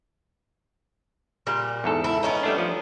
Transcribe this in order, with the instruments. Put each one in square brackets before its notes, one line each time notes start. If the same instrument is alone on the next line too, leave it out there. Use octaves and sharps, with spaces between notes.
[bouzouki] A#2 G3
[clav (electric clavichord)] E2 G#2 A4
[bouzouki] E4
B3 C#4 D#4
[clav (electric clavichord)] G3 A3 D4
F3